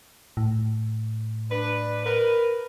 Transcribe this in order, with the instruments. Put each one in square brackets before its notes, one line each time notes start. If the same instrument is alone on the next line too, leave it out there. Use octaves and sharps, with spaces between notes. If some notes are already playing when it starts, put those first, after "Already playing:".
[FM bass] A2
[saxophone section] D4 B4
A#4 B4